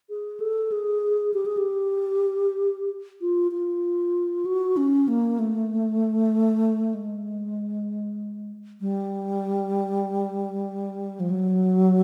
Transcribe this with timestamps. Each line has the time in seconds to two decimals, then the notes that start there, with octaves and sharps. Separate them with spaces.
0.10 G#4
0.40 A4
0.72 G#4
1.34 G4
1.46 G#4
1.57 G4
3.21 F4
3.52 F4
4.45 F#4
4.77 C#4
5.08 A#3
5.39 A3
6.94 G#3
8.81 G3
11.20 F3
11.30 F#3